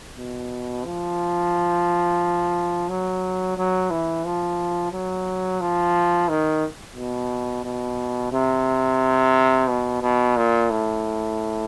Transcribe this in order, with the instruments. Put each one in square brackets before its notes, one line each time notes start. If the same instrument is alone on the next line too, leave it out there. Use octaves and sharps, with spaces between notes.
[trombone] B2
F3
F#3
F#3
E3
F3
F#3
F3
D#3
B2
B2
C3
B2
B2
A#2
A2